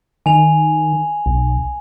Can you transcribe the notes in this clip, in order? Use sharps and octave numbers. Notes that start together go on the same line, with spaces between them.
D#3 G#5 F7
B1